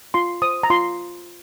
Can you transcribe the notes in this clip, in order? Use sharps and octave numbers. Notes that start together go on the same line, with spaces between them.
F4 C6
C5 D#6
A#5
F4 C6